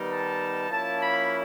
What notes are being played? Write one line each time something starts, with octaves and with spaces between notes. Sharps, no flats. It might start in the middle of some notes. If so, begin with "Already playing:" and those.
Already playing: D#3 G3 B3 D#4
A5
F3 A#3 C#4 E4 A5
B5